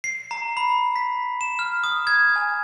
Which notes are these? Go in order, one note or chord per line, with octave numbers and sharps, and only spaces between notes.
C7
A#5
B5
B6
E7
F6
D#6
G#6
G#5